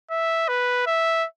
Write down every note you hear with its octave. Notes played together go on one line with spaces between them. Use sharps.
E5
B4
E5